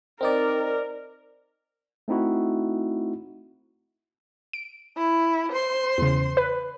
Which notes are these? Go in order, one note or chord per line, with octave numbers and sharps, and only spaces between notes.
C4 D#4 A#4 D5
A3 C4 D#4 E4 F#4
D7
E4
C5 C6
E2 C#3
B4